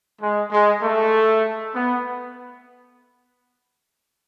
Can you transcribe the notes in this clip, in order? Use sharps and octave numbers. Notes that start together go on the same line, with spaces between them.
G#3
G#3
A3
B3